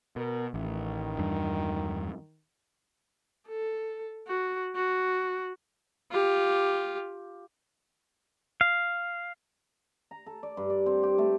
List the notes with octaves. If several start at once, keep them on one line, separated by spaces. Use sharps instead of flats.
B2 A#4
A1 D#3
E2 G2 D4
A4
F#4
F#4
F4 G4
F5
A#5
A4
D5
G2
D5
C4
G4
A3